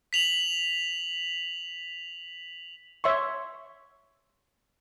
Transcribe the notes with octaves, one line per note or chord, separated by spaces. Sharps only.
B6 F7 F#7
C#5 E5 C6 C#6